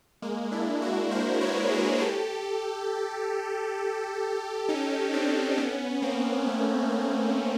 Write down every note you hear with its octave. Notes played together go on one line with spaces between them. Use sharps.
G#3 A#3
D4 E4
E4 F#4
A#4 C5
B4 C#5
G#4 A#4
G4 A4
C#4 D#4
C4 D4
B3 C#4
A#3 C4
A3 B3
A3 B3